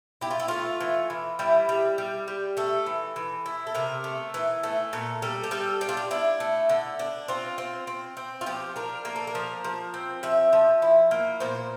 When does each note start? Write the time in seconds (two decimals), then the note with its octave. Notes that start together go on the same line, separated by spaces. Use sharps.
0.21 E4 G4
0.31 F4
0.40 E4
0.48 A3 F4
0.80 E3
1.10 E3
1.39 G3 E4
1.69 G3
1.98 G3
2.28 G3
2.57 A3 A4
2.86 E3
3.16 E3
3.46 E4
3.67 A4
3.75 C3 A#4
4.04 A3
4.34 E3
4.63 A3
4.93 A#2 A4
5.22 G3 A4
5.44 G4
5.51 G3 A4
5.81 D4 G4
5.89 F4
5.97 G4
6.11 D4 E4
6.40 A3
6.69 D3
6.99 D4
7.28 C4 F4
7.58 C4
7.87 C4
8.17 C4
8.41 F4
8.46 F3 G4
8.76 D4 A#4
9.05 A#3 A#4
9.16 A4
9.27 A#4
9.35 F3
9.64 F3
9.94 C4
10.23 F3 E5
10.53 F3
10.82 E4
11.11 A#3
11.40 A#2 C5